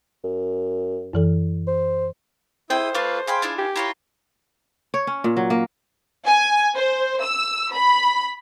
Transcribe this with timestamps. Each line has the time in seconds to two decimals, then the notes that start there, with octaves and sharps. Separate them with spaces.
0.24 F#2
1.13 F#2 E3 A4
1.67 C5
2.70 E4 G#4 C5 G5 D#6
2.94 A3 F4 B4 F5 D6
3.27 G#4 F5 G5 G#5 B5 C6
3.42 D4 E4 F4
3.59 G4 G#5
3.76 E4 F4 C#5 A#5 C6
4.94 C#5
5.07 C#4
5.24 A#2
5.37 F#3
5.50 A#3
6.25 G#5
6.74 C5
7.21 E6
7.72 B5